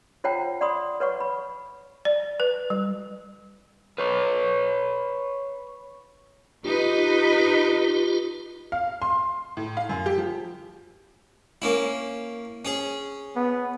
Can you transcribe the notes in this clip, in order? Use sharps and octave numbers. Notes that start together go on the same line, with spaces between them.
F4 C5 C#5 F#5 G5 A#5
D5 F#5 B5 C6 D#6
B4 C#5 F#5 C#6
B5
D5
B4
G3
B4 C#5
D#4 F4 G4 B4
F5
C6
A2
F5
F#2
G4
F3
A#3 C#4 E4
C#4 G#4
B3